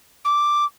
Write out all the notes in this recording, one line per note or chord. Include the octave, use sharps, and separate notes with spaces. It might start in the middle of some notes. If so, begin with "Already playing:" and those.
D6